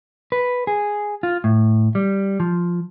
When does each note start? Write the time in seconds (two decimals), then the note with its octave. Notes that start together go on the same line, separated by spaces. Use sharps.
0.32 B4
0.67 G#4
1.23 F4
1.44 A2
1.95 G3
2.40 F3